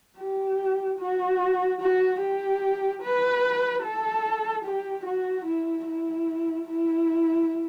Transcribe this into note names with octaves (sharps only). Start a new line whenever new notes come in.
G4
F#4
F#4
G4
B4
A4
G4
F#4
E4
E4
E4